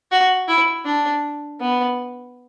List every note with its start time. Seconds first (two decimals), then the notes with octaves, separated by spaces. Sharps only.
0.11 F#4
0.48 E4
0.85 D4
1.60 B3